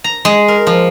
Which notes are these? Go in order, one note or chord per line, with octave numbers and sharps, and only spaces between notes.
A#5
G#3
A#4
F3